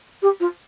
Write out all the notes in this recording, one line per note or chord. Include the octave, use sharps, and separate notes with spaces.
G4
F4